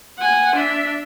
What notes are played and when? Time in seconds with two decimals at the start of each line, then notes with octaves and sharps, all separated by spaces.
0.18 F#5 G#5
0.56 D4 E5